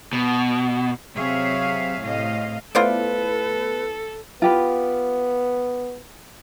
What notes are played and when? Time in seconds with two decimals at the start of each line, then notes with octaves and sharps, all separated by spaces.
0.13 B2
1.16 C3 F#3 G#4 C#5 E5 F5
2.01 A2 C3 D#5 F5
2.75 A3 B3 E4 F4 A4 B4 C5 D5
4.42 B3 F4 G4 B4